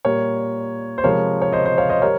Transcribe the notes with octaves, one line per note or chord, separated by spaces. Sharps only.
A#2 G3 A#4 C#5
C5
C3 F3 G#3 A#4 C#5
C#5
C5 D#5
C5 D#5
C#5 F5
C5 D#5
G3 A#4 C#5